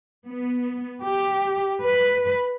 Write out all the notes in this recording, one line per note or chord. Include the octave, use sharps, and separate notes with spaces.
B3
G4
B4